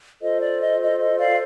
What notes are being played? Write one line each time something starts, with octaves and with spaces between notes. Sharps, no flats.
F4 A4 C5 D#5
D5
D#5
D#5
D#5
D5 F5